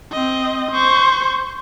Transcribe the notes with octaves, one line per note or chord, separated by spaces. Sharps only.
C4 D#5
C5 C#6